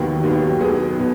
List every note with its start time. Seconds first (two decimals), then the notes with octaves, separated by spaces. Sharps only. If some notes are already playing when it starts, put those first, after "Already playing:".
Already playing: D#2 D#3 F#3 B3
0.24 D#2 D#3 F#3 B3
0.61 B1 B2 B3 G#4
0.98 B2 B3